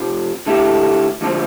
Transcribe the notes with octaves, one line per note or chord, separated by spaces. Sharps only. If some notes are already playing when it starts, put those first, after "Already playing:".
Already playing: F2 C3 F3
D3 A3 E4 G4
D2 D3 F3 C4